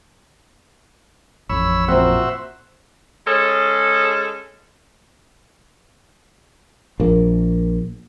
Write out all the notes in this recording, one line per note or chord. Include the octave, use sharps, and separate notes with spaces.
A1 F2 C#5 B5 E6
A#2 C4 F#4 C5 E5
G#3 C#4 G#4 A4
A#1 A#3